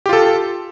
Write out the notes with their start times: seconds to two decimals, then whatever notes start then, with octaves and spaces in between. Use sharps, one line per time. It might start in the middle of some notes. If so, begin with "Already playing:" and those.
0.06 G4
0.09 F4
0.13 A4
0.16 A5